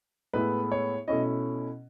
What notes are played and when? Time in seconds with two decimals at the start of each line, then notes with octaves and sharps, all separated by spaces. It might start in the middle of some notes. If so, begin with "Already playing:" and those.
0.33 A2 G#3 B3 E4 B4
0.72 C#5
1.08 B2 A3 C#4 E4 D#5